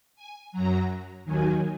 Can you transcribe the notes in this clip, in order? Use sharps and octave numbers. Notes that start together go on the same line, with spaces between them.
G#5
F#2 F#3 A#5
D#2 D#3 F#3 G#5